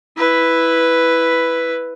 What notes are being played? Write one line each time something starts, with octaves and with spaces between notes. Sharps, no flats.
E4 B4